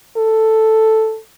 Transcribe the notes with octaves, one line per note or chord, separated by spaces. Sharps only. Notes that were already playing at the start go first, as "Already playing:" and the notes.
A4